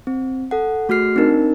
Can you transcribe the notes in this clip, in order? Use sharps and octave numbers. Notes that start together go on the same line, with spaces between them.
C4
A4 F#5
A3 F#4 G#4 F6 C7
C4 D4 D#4 A#4